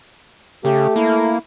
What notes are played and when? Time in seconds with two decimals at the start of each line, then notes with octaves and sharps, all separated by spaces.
0.65 C#3 A3 G4
0.96 A#3 E4